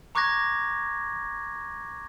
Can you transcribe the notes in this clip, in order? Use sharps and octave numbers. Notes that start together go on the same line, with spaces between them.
A#5 C#6 D6 F#6 G#6 A#6